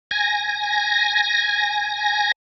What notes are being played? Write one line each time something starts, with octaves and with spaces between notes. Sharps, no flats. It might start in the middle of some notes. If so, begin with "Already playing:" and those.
G#5 A#6